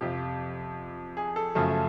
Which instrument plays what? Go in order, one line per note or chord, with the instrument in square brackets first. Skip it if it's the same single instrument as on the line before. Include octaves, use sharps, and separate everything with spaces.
[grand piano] F2 C3 F3 G4
G#4
A4
F#2 C#3 F3 A3